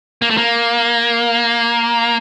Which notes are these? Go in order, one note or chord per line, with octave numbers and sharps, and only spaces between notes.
A#3
A3
A#3